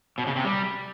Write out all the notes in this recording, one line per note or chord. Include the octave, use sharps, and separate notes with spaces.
B2
C#3
C3
G3